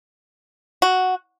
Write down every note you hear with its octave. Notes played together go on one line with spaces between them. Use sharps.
F#4